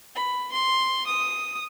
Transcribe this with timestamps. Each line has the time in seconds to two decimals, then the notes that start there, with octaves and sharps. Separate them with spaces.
0.15 B5
0.52 C6
1.07 D#6